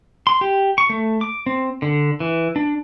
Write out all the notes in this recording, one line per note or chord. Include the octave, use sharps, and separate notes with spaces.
C6
G4
C#6
A3
D6
C4
D3
E3
D4